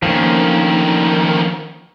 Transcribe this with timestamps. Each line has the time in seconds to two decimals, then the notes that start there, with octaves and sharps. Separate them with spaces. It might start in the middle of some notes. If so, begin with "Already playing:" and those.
0.03 D2 D#3 F3 A#3 C#4